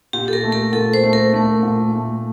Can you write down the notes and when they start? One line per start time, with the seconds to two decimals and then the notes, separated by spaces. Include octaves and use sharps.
0.13 A#2 G4
0.28 A4
0.33 A#4
0.43 A3
0.52 A#4
0.73 A#2 A4
0.94 C5
1.03 A3
1.13 A#4
1.34 A3
1.63 A#2
1.93 A3